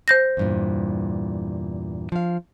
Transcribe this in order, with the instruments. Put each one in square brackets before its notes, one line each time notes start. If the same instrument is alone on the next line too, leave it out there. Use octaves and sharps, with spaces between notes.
[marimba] C5 G6 A#6
[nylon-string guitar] E2 G2 A#2
F3 F5